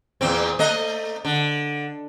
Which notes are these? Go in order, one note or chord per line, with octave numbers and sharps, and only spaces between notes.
E2 A#2 C4
A3 D#5
D3